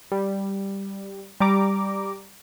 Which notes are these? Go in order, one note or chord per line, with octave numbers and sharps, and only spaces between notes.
G3
G3 A#5 D6